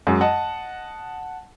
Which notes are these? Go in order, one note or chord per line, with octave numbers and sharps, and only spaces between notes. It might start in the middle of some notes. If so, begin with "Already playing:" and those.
F#2 G#3 F#4
D#5 F#5 A5